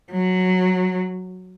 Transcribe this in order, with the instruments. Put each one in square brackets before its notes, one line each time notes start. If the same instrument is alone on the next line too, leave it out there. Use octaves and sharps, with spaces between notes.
[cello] F#3